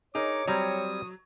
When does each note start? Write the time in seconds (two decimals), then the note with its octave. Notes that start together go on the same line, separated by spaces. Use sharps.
0.15 D#4 G#4 A#4 C#5 D6
0.47 F#3 G3 C4 D5 D#6